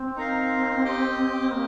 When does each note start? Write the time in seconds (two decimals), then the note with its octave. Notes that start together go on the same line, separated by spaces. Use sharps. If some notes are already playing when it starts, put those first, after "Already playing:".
Already playing: C4
0.16 D#4 A#4 F5
0.84 G4 D#5 G5
1.51 A#3 G4 D#5